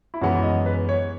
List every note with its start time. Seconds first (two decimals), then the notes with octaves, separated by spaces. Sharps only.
0.14 E4
0.21 F#2 E3 G#3 B3 F#4
0.43 D#5
0.66 B4
0.89 C#5